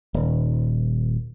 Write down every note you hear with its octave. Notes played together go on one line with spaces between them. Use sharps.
D#1